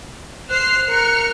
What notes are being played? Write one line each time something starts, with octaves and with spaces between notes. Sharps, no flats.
C5 F6 F#6 C7
A#4 F6 C#7